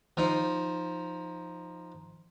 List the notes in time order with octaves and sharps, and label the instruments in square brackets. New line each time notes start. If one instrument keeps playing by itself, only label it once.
[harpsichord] F3 D#4